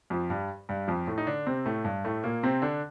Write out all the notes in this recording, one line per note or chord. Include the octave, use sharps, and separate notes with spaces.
F2 F3
G2 G3
G2 G3
F2 F3
A2 A3
D#4
D3 D4
C3 C4
A2 A3
G2 G3
A2 A3
A#2 A#3
C3 C4
D3 D4